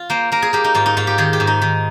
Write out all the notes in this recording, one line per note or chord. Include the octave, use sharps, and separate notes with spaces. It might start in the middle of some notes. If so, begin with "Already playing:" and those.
Already playing: F4
A#3 C5
A#3 A#4
G#4
A#3 G4
D#4
G#2 F4
D#4
G#2 F4
G4
D#3 G#4
G4
G#2
D#4
D#3